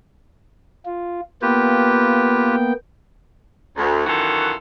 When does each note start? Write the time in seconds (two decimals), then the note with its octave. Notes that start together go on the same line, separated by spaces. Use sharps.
0.85 F4
1.42 A#3 B3 F4 G4 B4 G5
3.77 D2
4.07 F#2 D#3 E3 F4 F#4 A4